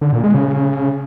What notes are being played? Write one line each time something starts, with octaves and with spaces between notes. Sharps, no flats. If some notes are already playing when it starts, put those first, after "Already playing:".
D3
A#2
G#3
C#3